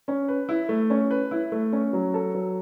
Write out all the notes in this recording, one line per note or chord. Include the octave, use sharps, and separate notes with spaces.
C#4
B4
E4
A3
C#4
B4
E4
A3
C#4
F#3
A4
F#3